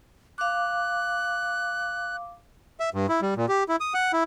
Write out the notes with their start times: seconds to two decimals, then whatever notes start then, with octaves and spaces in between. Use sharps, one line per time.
0.38 F5 D6 F#6
2.80 E5
2.94 G2
3.09 E4
3.22 G3
3.37 A#2
3.48 G4
3.69 E4
3.80 D#6
3.94 F#5
4.13 E4